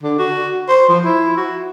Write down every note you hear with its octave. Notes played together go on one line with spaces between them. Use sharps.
D3
F#4
C5
F3
E4
F#4